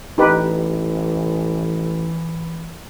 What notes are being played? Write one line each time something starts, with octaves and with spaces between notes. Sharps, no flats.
A1 E3 D#4 G4 B4